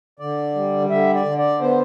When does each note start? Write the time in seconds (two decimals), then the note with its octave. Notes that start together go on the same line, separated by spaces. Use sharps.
0.19 D3 D5
0.55 G3
0.90 D3 E5
1.14 D5
1.25 D3
1.38 D5
1.60 B3 C5